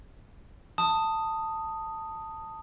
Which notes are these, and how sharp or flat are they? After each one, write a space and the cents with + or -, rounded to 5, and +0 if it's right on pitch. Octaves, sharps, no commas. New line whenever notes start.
A5 +15 D#6 +0